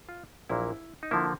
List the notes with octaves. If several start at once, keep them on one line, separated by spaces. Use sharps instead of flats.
F4
A#1 A#2 F#3 A#3 E4
D#4
D3 F3 A#3 E4